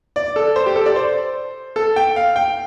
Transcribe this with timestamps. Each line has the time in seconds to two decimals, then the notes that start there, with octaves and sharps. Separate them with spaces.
0.16 D5
0.36 A4
0.56 C5
0.66 G4
0.76 A4
0.86 D5
0.96 C5
1.76 A4
1.96 G5
2.16 F5
2.36 G5